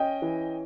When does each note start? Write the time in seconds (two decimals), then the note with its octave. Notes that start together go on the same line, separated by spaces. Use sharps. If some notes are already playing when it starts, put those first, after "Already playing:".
Already playing: C#4 D#5 G5
0.22 E3